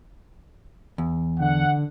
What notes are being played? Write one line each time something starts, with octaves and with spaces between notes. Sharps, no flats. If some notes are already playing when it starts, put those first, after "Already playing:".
E2
D3 F#5